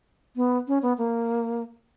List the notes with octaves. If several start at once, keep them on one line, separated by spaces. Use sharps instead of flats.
B3
C#4
B3
A#3